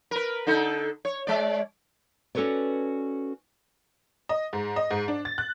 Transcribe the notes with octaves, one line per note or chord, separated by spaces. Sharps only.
A#4 B4
D3 D#4 A4
C#5
G#3 D5
C#4 F#4 A4 B4 C#5 D5
D#5
G#2
D#5
G#2
D4
A6
F#6